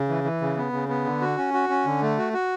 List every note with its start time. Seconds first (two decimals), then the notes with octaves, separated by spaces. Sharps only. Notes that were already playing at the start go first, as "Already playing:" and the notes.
Already playing: C#3
0.09 E3
0.24 E3
0.41 C#3
0.57 B3
0.73 C#3
0.89 B3
1.04 D3
1.21 F#4
1.38 C#4
1.54 F#4
1.69 C#4
1.86 D3
2.02 A3
2.18 F#4
2.33 F#4